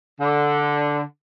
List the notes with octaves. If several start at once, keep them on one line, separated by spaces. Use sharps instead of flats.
D3